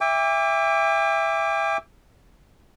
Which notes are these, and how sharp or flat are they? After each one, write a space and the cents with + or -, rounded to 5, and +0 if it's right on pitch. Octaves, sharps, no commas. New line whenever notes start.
E5 +5 G5 +45 D6 -10